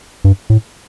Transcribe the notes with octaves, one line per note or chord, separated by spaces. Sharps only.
G2
A2